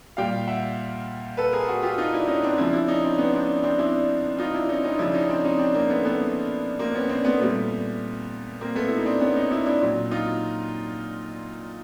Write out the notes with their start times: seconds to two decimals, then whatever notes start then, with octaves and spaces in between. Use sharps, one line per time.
0.17 A#2 G3 F5 G5
0.48 E5 F#5
1.37 A4 B4
1.53 G#4 A#4
1.68 F#4 G#4
1.83 F4 G4
1.98 D#4 F4
2.13 D4 E4
2.28 C#4 D#4
2.43 C4 D4
2.58 C#3 F3 D4 E4
2.73 D4 E4
2.88 C#4 D#4
3.04 C4 D4
3.18 B3 C#4
3.34 C4 D4
3.63 C4 D4
3.78 D4 E4
4.38 D#4 F4
4.54 D4 E4
4.69 C#4 D#4
4.84 C#4 D#4
4.99 C#3 F3 D4 E4
5.14 C#4 D#4
5.29 C4 D4
5.44 C#4 D#4
5.59 C4 D4
5.74 A#3 C4
5.90 A3 B3
6.04 A3 B3
6.79 A#3 C4
6.95 B3 C#4
7.09 C4 D4
7.25 A3 B3
7.40 A#2 G3 A3 B3
8.61 A#3 C4
8.75 A3 B3
8.88 E4
8.97 D#4
9.06 C4 D4
9.21 B3 C#4
9.35 C#4 D#4
9.50 D4 E4
9.66 D4 E4
9.82 A#2 F#3
10.11 D#4 F4